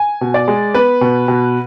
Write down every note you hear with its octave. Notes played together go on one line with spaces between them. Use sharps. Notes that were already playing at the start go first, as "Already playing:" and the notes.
Already playing: G#5
B2
D5
G#3
B3 B4
B2
B2